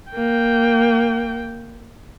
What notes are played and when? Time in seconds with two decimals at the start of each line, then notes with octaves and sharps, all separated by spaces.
0.12 A#3 G5